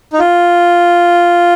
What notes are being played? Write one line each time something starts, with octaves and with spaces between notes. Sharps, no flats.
D#4
F4